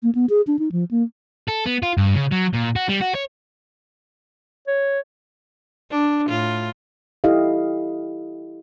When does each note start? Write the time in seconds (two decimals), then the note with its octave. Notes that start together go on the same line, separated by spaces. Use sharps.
0.03 A#3
0.15 B3
0.30 G#4
0.47 D4
0.59 D#4
0.72 F3
0.91 A#3
1.48 A4
1.66 B3
1.82 F4
1.97 G2
2.15 C#3
2.32 F#3
2.54 A#2
2.76 F#4
2.89 G3
3.01 F#4
3.15 C#5
4.68 C#5
5.91 D4
6.29 A2 F4
7.24 E4 G4 A4 D#5 F5